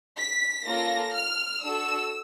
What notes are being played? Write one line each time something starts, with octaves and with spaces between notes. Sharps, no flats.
B6
A#3 C#4 F4 A4 A#6
F6
D4 F#4 A4 E6